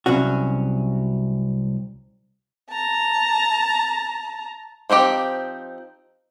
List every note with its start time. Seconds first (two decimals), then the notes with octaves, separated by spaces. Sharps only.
0.06 C2 F#3 C#4 F#4
2.70 A5 A#5
4.90 F3 C4 D#4 G4